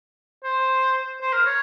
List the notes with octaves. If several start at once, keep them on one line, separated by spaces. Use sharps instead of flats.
C5
C5
A#4
C#5